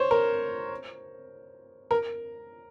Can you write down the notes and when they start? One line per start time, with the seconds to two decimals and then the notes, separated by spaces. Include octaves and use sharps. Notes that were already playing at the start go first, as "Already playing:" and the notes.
Already playing: C5 C#5
0.11 A#4
1.91 A#4